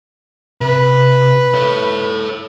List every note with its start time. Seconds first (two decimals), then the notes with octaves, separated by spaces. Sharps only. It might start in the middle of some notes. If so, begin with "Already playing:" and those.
0.61 C3 B4
1.54 A4 C#5